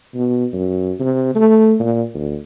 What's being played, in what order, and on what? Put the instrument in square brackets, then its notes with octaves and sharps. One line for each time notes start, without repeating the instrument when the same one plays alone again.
[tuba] B2
F#2
C3
A3
A#2
D2